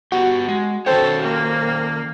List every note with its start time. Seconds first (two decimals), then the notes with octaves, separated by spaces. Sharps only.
0.12 B3 F#4 G4
0.49 G#3
0.86 D#3 C#4 A4 C5 C#5 G5
1.22 A#3